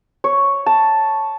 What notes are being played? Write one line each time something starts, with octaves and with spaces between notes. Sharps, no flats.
C#5
A5